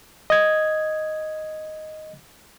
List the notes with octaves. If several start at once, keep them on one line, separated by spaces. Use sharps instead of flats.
D#5 G#6